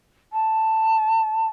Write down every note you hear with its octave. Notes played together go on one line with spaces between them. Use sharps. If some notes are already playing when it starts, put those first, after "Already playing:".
A5